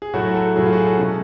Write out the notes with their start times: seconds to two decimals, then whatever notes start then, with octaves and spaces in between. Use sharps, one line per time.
0.02 G#4
0.13 A2 F#3 A3 F#4
0.35 A4
0.56 A2 F#3 A3 G#4
0.66 F4
0.73 F#4
0.77 G#4
0.87 A4
0.98 B2 G#3 C#4